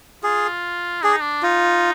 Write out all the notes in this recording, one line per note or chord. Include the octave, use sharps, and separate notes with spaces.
F4 G#4
D4 G#4
D#4
D4
D#4 F4